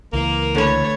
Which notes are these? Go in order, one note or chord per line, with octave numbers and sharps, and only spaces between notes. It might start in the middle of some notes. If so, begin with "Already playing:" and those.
C#2 E3 A#3
D3 A3 B4 C#5